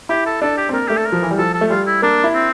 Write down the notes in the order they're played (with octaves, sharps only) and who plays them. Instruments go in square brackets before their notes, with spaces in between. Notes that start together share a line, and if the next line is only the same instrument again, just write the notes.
[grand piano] E4 [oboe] G4
[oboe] A4
[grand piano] D4 [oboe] A4
[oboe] G4
[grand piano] C4
[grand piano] A#3 [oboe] A#4
[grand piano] A3 [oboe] G4
[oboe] A4
A#4
[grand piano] F3
E3
G3
[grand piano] F3 [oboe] A4
[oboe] A4
[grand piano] A3
[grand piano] G3 [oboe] F4
[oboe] E4
[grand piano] A#3 [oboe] D4
[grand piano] E4
[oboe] C4